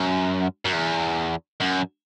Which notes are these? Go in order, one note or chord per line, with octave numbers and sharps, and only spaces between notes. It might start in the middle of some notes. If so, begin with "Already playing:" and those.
Already playing: F#2
F#2
E2
F#2